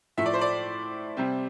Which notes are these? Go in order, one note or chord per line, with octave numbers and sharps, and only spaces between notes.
A2 F3 A3 E5
D5
C5
D5
C3 G3 C4